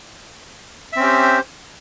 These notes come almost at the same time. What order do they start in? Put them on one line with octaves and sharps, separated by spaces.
E5 C4 C#4 G4 C5